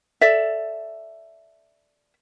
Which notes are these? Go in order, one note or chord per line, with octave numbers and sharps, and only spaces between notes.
A4 D5 E5